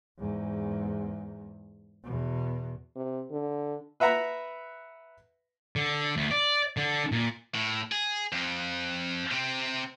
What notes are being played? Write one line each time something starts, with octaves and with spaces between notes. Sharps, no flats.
E2 G#2
E2 B2
C3
D3
B4 E5 F#5 A#5 B5
D3
D2
D5
D3
A#2
A2
G#4
F2 F3
C3 C4